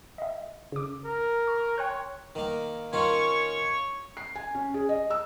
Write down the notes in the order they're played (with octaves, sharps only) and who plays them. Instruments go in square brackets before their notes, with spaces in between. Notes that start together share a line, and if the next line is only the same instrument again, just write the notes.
[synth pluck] D#5 E5
C#3 D6
[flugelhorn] A#4
[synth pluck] C#6
[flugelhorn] C#5 [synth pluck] G5 C6 F#6
[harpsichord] D#3 A#3
[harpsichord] D#3 C#4 F4 [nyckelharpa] C#5 C#6
[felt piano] C7
G#5
C#4
G#4
D#5
E6